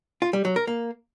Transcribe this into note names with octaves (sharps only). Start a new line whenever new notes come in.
F4
G3
F#3
A#4
A#3